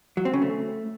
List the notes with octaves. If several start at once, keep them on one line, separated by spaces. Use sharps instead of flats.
F#3
C4
C#3
A3